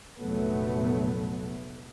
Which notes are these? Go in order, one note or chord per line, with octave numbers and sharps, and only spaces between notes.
F1 A#1 F#3 A3 B3